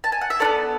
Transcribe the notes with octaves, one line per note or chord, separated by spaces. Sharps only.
A5
G#5
F#5
E5
B3 D4 A4 D5